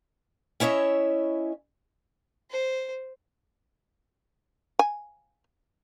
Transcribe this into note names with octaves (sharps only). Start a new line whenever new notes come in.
C#4 E4 C#5 D#5 E5
C5
G#5